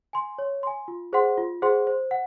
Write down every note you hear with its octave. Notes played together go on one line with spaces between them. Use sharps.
G#5 C6
C#5
G#5 C6
F4
G#4 C5 F#5 C6
F4
G#4 C5 F#5 C6
C5
F#5